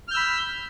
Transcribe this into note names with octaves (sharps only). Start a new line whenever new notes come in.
B5 E6 F6 G6